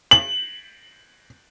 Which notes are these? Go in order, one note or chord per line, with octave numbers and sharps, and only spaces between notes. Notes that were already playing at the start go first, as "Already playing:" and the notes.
F#7